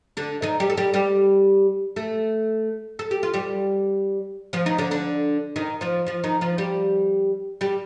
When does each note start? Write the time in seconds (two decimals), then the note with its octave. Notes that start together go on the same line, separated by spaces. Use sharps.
0.17 D3 D4
0.42 D#3 D#4
0.60 G3 G4
0.70 A4
0.77 G3 G4
0.94 G3 G4
1.96 A3 A4
2.99 A4
3.11 G4
3.23 F4
3.34 G3 G4
4.53 F3 F4
4.66 D#3 D#4
4.78 D3 D4
4.91 D3 D4
5.56 D#3 D#4
5.81 F3 F4
6.07 F3 F4
6.24 D#3 D#4
6.41 F3 F4
6.58 G3 G4
7.61 G3 G4